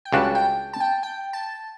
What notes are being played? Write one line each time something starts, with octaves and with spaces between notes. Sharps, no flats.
G5
C#2 C#3 G3 D4 F#4 A5
G5
A5
G5
G5
A5